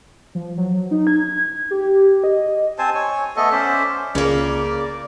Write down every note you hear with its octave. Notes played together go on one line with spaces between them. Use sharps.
F3
F#3
D#4
G#6
G4
D#5
C4 C5 G#5 A5
C#5 G#5
A3 B3 A4 D#5
C#4 C5 D5 E5
C#2 C#3 A#3 D5